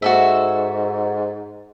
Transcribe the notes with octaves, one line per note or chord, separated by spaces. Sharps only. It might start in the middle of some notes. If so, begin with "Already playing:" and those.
G#2 F#4 A4 E5